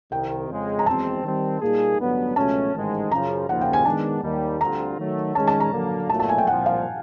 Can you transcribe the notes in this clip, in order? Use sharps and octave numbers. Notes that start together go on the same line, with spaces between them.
C2 C3 D#3 G5
F2 C#3 F3 G#3
A#5
F#1 E2 B2 G#3 C4 A5
D#3 G3 C4
A#2 G3 A#3 D#4 G#4
A1 G2 D3 F#3 B3
C#2 B2 F#3 A3 C#4 A5
A1 G#2 D#3 G#3
F#2 C#3 F3 A#5
D#2 C#3 F3 F#5
G5
G#5
D#3 G#3 B3 D4 A5
D#2 D#3 G3
D2 D3 G3 C4 F4 A#5
D#3 F#3 A3
D#3 G#3 C#4 A5
A5
A#5
D3 F#3 A#3
B1 A#2 F#3 A3 A5
A5
G#5
G5
C2 A#2 F3 F#5
F5